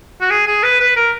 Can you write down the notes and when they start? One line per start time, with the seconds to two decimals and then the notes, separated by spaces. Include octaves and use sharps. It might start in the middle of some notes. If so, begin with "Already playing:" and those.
0.21 F#4
0.31 G#4
0.47 G#4
0.63 B4
0.80 B4
0.96 A#4